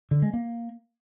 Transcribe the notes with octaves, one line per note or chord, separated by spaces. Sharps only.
D3
G#3
A#3